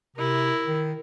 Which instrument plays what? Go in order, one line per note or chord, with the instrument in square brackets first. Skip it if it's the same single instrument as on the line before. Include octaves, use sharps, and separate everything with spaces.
[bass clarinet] C3 [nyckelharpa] E4 A#4
[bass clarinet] D#3